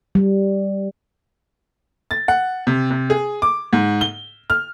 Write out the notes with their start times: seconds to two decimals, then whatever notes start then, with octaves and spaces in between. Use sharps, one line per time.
0.15 G3
2.11 A6
2.28 F#5
2.67 C3
2.91 C3
3.10 G#4
3.42 D6
3.73 G#2
4.01 G7
4.50 F6